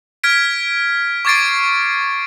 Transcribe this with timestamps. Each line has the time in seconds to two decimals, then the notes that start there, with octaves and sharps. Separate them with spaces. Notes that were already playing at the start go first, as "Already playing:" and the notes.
0.24 F6 G#6 B6 D7
1.25 C#6 D6 G#6 A6 C7 D7